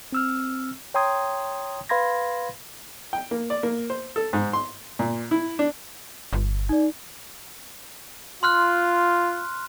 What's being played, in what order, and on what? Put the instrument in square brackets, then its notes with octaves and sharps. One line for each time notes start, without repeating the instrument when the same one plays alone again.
[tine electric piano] C4 E6 F6
C#5 G5 A#5 C6 D#6 G#6
B4 F5 B5 C6 G#6 A#6
[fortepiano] G5
A#3
D5
A#3
C5
A4
G#2
C6
A#2
E4
D4
[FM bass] G1
[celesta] D#4 D5
[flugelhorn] F4 [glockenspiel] C6 F6 F#6